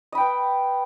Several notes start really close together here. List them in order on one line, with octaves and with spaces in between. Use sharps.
D#5 B5 G5 B4